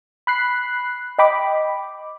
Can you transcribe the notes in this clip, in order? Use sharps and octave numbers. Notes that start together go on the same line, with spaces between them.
B5 F#6 C7
D#5 G5 B5 D6